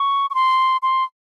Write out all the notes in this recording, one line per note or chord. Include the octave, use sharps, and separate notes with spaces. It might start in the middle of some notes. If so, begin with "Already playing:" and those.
Already playing: C#6
C#6
C6
C6